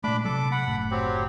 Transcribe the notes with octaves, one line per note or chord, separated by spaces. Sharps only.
A#2 G#3 A3 D4 B5 D6
C3 F#3 A4 D6
F#5 B5
F#1 A2
F#3 C4 G4